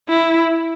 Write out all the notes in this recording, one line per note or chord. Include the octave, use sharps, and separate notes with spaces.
E4